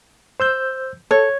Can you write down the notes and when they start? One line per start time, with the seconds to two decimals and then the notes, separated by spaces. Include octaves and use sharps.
0.40 C5 E6 G6
1.11 A4 C#5